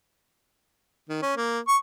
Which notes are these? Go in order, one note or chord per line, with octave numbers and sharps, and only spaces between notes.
D#3
C#4
A#3
C#6